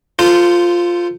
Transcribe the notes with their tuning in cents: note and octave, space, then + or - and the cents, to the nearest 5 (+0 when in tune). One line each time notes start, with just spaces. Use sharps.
F4 +0 A4 +30 C5 -15